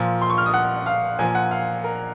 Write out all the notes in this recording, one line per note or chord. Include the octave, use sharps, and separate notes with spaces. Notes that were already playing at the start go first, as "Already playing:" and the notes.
Already playing: A#2 F3
C6
C#6
F6
D#6
F#5
F5
A#2 F3 G#5
F#5
F5
A#4